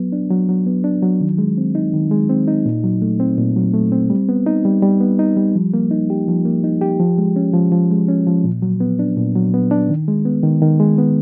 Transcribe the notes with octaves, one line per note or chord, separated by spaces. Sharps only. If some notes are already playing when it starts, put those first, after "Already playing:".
Already playing: F#3 B3
D4
F#3
F#3
B3
D4
F#3
D#3
G#3
C4
D#4
D#3
G#3
C4
D#4
A#2
F#3
A3
C4
A#2
F#3
A3
C4
G3
B3
D#4
G3
G3
B3
D#4
G3
F3
A#3
D#4
G4
F3
A#3
D#4
G4
F3
G#3
C#4
F3
F3
G#3
C#4
F3
A#2
F#3
B3
D4
A#2
F#3
B3
D4
D#3
G#3
B3
D#3
D#3
G#3
B3